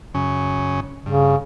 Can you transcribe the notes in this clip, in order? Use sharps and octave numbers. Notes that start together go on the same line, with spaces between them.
F#2 C#3 C#4
G2 C#3